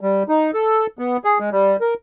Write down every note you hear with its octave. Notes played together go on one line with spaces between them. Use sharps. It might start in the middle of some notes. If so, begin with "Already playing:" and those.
G3
D#4
A4
B3
G#4
G#3
G3
A#4